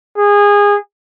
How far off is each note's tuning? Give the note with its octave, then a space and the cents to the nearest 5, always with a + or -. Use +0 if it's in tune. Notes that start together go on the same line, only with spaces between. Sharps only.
G#4 -25